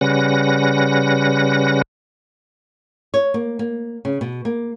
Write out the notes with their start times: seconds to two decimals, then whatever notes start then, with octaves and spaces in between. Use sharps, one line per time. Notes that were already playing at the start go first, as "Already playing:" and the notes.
0.01 C#3 G3 C#4 B4 F#5 A#6
3.14 C#5
3.34 A#3
3.59 A#3
4.05 C#3
4.21 B2
4.45 A#3